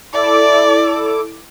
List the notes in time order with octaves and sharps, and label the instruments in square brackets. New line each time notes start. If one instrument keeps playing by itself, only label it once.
[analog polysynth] E4 A4 D6 [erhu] D5